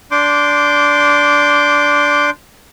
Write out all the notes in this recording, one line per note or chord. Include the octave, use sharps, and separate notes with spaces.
D4 C6 D6 G6